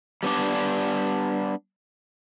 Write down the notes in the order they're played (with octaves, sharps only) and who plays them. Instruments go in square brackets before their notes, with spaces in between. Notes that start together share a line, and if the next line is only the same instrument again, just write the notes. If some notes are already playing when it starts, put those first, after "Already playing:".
[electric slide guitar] G3 B3 D4 D5